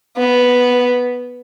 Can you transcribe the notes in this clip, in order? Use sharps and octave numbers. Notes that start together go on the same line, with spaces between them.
B3